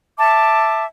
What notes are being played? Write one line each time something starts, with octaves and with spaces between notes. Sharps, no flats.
E5 A5 D6